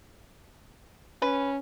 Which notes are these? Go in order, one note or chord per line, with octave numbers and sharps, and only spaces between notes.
C#4 B4